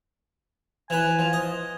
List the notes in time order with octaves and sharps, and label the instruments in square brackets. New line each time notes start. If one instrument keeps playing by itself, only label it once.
[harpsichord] E3 B4 [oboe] G#5
[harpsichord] F3
D#5